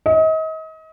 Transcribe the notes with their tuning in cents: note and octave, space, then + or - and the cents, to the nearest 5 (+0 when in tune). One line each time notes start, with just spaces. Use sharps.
D#5 +35